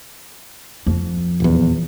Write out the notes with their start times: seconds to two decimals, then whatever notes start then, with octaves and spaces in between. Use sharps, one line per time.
0.87 F2
1.40 D#1 E2